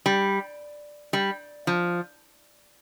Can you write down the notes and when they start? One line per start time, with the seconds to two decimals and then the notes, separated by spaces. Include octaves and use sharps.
0.06 G3
1.13 G3
1.67 F3